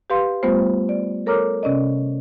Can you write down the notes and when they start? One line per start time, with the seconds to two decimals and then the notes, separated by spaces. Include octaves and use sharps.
0.10 G4 B4 F5 C6
0.43 G3 A3 B3 F4 C5
0.89 D5
1.26 A4 A#4 C#5 A#5 D6 F6
1.63 C3 C#4 D5 D#5